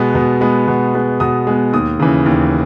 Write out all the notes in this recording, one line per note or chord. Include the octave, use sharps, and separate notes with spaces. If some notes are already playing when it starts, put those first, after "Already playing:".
Already playing: B2 G#3 B3
B2
G#3 B3
B2
G#3 B3
B2 D#6
G#3 B3
D#2 D#6
C#3 E3
D#2